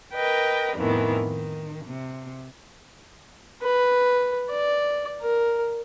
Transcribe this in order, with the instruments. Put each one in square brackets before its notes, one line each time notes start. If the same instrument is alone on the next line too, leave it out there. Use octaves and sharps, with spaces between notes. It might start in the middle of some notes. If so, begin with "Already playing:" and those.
[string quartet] A#4 B4 D#5 G5
F2 A2 D#3 E3 B3
D#3
C3
[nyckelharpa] B4
D5
A#4